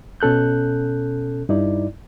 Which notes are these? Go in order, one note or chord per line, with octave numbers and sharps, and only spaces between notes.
B2 C#4 A4 F#6 G6
G2 D#4 E4 D5